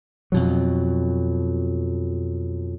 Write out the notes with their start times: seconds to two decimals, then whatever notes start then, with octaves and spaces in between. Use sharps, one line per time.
0.32 F2 B2 F#3